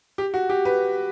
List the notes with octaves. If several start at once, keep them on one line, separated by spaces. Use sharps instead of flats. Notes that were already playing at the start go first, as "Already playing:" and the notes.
G4
F#4
G4
B4